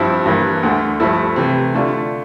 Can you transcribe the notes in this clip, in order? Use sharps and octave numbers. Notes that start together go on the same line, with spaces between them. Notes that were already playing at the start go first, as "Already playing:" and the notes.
Already playing: G2 F3 C4 E4
G2 E3 A#3
D2 D3 A3
G2 F3 A3 E4
C3 E3 A3
D3 A3 D4 F4